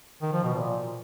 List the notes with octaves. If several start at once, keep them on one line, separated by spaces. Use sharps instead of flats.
D#3
F3
B2
A#2